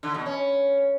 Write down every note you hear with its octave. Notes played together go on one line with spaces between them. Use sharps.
D3
B2
C#4